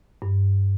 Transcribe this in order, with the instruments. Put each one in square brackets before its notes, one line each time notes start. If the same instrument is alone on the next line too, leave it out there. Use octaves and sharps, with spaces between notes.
[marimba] G2